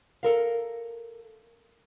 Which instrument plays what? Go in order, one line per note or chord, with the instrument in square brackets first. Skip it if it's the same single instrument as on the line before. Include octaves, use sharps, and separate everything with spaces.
[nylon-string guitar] A4 A#4 F5